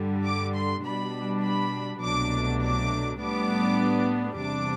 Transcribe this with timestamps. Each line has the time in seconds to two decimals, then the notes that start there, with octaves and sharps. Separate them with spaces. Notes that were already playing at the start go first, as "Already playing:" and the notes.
Already playing: G2 D3 G3
0.25 D6
0.54 C6
0.84 B2 G3 D4 B5
1.42 B5
2.02 C2 B2 F#3 A3 D4 D6
2.61 D6
3.20 A2 G3 B3 D4 D6
4.38 E2 C3 G3 D4 D6